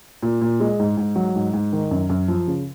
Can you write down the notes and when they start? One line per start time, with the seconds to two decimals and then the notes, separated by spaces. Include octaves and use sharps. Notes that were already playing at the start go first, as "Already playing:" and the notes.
0.23 A#2
0.41 A#2
0.60 G#3
0.80 G#2
0.97 G#2
1.16 F#3
1.36 G#2
1.53 G#2
1.73 D#3
1.91 F#2
2.09 F#2
2.28 F3
2.48 C#3